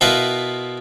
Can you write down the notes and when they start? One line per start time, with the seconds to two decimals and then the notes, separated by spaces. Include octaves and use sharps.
0.01 B2 E4 F4 A#4 B4